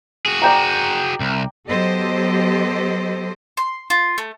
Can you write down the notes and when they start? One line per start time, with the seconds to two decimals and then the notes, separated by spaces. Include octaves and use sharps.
0.26 F#4 G#4
0.42 D5 G5 A#5
1.20 C2
1.68 F#3 B3 G4 A4 C5 D#5
3.57 C6
3.90 F4
4.18 A3